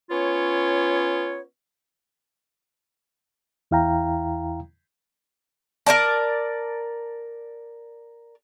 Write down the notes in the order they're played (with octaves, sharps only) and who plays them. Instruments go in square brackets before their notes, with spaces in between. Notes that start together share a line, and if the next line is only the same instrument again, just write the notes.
[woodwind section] B3 C#4 F4 C#5
[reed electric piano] E2 E4 F5 G5 A#5
[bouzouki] A#4 C#5 D5 A5